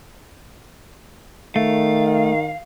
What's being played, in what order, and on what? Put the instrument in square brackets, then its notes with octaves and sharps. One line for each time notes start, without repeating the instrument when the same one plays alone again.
[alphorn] D#3 [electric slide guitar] A3 [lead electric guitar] F5